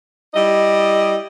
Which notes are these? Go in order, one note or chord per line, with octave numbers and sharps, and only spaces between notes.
G3 E4 D#5